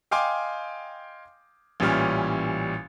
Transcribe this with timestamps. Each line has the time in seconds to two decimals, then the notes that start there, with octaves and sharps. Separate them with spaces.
0.11 D#5 F5 G5 G#5 C6 D6
1.80 A1 A#2 E3 G3 C#4 F6